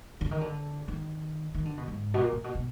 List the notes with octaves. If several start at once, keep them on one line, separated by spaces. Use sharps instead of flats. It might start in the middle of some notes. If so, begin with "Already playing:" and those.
D3
D#3
D3
D#3
D#3
D3
B2
G#2
B2
A#2
A#2
B2
B2